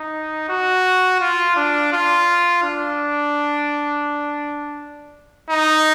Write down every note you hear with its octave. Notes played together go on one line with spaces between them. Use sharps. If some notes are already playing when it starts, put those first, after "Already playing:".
Already playing: D#4
F#4
F4
D4
F4
D4
D#4